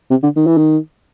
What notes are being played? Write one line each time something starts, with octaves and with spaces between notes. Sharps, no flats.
C3
D3
D#3
E3
D#3